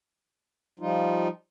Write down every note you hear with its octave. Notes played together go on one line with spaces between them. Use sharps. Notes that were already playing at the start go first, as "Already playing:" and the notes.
F3 G3 D#4 F4